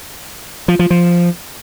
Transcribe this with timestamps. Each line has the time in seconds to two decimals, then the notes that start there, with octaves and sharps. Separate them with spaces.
0.68 F3
0.79 F3
0.90 F3